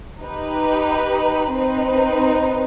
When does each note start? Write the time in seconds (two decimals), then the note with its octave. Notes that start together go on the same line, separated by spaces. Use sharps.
0.21 D#4 G4 B4
1.54 C4 D#4 B4